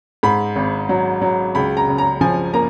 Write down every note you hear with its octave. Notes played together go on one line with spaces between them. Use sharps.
G#2 B5
G#1
F#3
F#3
C#2 B5
A#5
C#3
A#5
F3 G#5
A#3 A#5